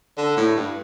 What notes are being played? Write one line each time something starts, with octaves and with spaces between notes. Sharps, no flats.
D3
A2
G2